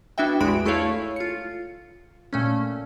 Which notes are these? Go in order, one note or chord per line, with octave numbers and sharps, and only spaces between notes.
B3 D4 E4 F#4 E5 G5
A#1 E2 G#3 F#4 B5 D7
A3 E4 G#4 A4 C#5 F5
F4 C#7
A#2 A3 C#4